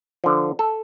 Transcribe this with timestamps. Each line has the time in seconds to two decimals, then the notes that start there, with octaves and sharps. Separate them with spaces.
0.24 D3 F3
0.59 A4